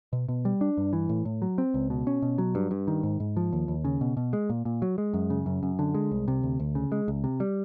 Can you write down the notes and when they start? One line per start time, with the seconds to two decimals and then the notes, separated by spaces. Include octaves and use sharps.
0.13 B2
0.29 B2
0.45 G3
0.61 D4
0.78 G2
0.93 E3
1.09 A2
1.25 A2
1.42 F#3
1.58 C4
1.74 C#2
1.90 B2
2.07 C#4
2.22 B2
2.38 F#3
2.55 G2
2.71 G2
2.88 D#3
3.03 G#2
3.20 G#2
3.37 F3
3.53 D#2
3.68 D#2
3.84 C#3
4.01 B2
4.17 B2
4.33 G#3
4.50 A#2
4.65 A#2
4.82 F#3
4.98 G#3
5.14 F#2
5.30 C#3
5.46 F#2
5.63 F#2
5.79 D3
5.94 G#3
6.12 C2
6.28 C3
6.43 D2
6.60 D2
6.75 C#3
6.92 G#3
7.08 C#2
7.24 C3
7.40 G3